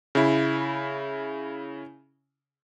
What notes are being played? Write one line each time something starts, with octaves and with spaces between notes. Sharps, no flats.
C#3 E4